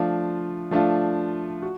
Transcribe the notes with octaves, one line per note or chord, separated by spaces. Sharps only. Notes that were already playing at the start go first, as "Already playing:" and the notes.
Already playing: F3 A3 D4 F4
F3 A3 D4 F4
F#4